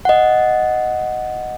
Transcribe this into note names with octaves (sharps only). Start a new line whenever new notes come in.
D#5 F#5